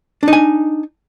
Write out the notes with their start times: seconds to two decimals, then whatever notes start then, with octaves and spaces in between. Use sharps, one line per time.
0.23 D4
0.28 D#4
0.33 G#5